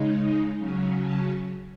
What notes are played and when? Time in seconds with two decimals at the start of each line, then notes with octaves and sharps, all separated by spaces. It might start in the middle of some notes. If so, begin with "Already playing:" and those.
Already playing: C#3 G#3 D#4
0.58 C#3 F#3 C#4
1.02 A5